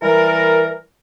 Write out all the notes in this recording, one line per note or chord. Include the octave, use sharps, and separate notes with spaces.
E3 G3 A#4